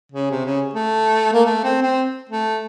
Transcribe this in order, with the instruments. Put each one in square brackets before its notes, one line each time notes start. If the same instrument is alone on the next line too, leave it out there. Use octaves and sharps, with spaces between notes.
[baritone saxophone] C#3
C3
C#3
A3
A#3
A3
C4
C4
A3